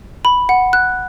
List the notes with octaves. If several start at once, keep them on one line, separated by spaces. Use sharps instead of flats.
B5
F#5
F#6